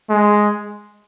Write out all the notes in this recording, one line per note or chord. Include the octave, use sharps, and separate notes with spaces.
G#3